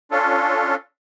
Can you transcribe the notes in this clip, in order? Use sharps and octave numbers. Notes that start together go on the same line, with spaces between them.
C#4 D4 F4 A4